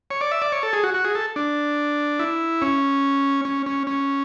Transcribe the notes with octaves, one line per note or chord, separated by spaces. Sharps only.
C#5
D5
E5
D5
C#5
A4
G#4
F#4
F#4
G#4
A4
D4
E4
C#4
C#4
C#4
C#4